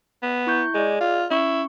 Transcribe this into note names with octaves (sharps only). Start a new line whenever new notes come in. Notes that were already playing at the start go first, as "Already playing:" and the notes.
B3
E4 C#6 G6
G#3 G#4 D5
F4
C#4 E4 C#6